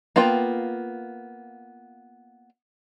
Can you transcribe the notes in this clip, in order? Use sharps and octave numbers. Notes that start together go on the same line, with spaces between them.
A#3 B3 F4 G5